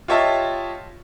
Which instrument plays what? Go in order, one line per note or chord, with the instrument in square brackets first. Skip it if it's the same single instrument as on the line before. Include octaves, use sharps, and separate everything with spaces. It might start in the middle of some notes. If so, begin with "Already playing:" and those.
[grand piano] F4 G4 C#5 D#5 E5 A5